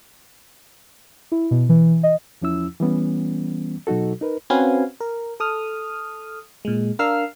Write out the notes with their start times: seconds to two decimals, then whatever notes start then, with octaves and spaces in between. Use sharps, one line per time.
1.32 E4
1.51 B2
1.69 E3
2.03 D#5
2.42 E2 F3 C#4 E4 E6
2.80 E3 G3 B3 C#4
3.87 B2 F#3 D#4 F#4 A4
4.21 D#4 A#4 B4
4.50 C4 C#4 F#4 B4 F5 G#5
5.00 A#4
5.40 A4 D#6 F6
6.65 A#2 G#3
6.99 D4 A#4 F5 E6 F6 C7